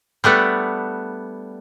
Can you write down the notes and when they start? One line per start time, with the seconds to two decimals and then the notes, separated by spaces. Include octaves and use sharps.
0.24 G3 A3 B3 D4